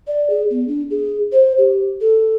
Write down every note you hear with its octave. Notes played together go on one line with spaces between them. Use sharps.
D5
G#4
B3
D4
G#4
C5
G4
A4